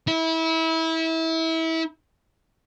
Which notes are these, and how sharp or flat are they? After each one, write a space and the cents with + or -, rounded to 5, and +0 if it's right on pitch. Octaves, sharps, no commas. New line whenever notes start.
E4 -25